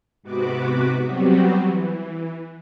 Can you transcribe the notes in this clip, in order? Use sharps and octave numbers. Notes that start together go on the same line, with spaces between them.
G#2 C3 B3 F#4 B4 D6
F#3 G3 B3 C4 F#4 G4
E3